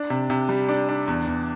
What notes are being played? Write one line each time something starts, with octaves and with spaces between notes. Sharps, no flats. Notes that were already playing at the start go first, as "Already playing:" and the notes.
Already playing: D4
C3
C3
G3
D4
D4
E2
E2